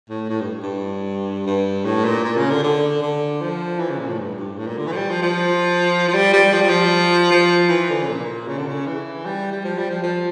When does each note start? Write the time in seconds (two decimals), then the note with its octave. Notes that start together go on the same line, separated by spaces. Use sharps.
0.10 A2
0.30 A2
0.41 G2
0.63 G2
1.46 G2
1.85 A2
2.05 A#2
2.24 A#2
2.37 C#3
2.51 D3
2.64 D3
3.02 D3
3.41 F3
3.80 E3
3.90 C#3
3.99 A#2
4.09 A2
4.19 G2
4.39 G2
4.58 A2
4.67 A#2
4.78 D3
4.87 E3
4.92 F3
4.97 G3
5.10 F3
5.23 F3
6.09 F3
6.14 G3
6.33 G3
6.53 F3
6.61 G3
6.69 F3
7.31 F3
7.70 E3
7.90 D3
8.02 C#3
8.09 A#2
8.48 C#3
8.58 D3
8.68 C#3
8.87 E3
9.26 G3
9.52 G3
9.65 F3
9.78 G3
9.90 F3
10.03 F3